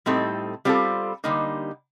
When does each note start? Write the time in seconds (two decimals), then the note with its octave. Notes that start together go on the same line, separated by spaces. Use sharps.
0.06 A2 G3 C4 D#4 A4
0.65 G3 C4 F4 A4
1.24 D3 G3 A#3 D#4